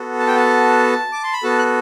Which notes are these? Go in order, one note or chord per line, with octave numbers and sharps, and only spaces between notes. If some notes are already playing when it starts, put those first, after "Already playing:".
Already playing: B3 F#4 A4
A5
G5
A5
D6
C6
B5
B3 F#4 A4 A5
F#6